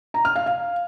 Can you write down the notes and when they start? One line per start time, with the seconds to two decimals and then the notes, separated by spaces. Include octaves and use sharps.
0.14 A#5
0.25 F6
0.36 F5
0.46 F5